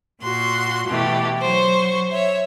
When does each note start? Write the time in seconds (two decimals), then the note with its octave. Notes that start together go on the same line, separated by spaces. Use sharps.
0.22 A#2 F#4 C6
0.86 B2 E3 A3 G4
1.41 F#3 C5 C#6
2.10 C#5 E5